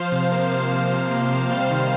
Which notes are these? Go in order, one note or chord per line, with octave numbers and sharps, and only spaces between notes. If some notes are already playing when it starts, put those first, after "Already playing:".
Already playing: F3 C5 F5
C3
A#3
C3
F3
C3
A#3
C3
G3 C5 F5
D#3